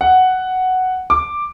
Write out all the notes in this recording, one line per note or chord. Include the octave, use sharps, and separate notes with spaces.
F#5
D6